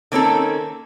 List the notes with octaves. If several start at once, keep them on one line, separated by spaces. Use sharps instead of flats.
D#3 A#3 C4 C#4 A4